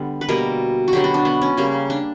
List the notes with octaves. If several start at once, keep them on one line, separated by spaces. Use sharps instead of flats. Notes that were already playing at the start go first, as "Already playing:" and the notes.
Already playing: D3 G3 B3
B4
B2 G3 A#3 A#4
F#4
D3 F#3 B3 G4
F#4
D4
B3
C#4
C#3 G3 A#3
D4